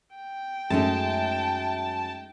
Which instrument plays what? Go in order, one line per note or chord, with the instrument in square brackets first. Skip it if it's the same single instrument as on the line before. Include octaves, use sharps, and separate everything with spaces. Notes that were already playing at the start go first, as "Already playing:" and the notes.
[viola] G5
[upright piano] F#2 [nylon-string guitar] G#3 A3 D#4 [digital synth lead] A5